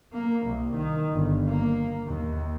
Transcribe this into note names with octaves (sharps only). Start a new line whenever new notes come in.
A#3
C2
D#3
G1
A#3
D#2